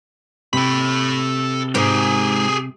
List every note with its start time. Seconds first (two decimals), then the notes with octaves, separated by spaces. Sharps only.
0.53 C3 A4 B5
1.75 G#2 G4 G#4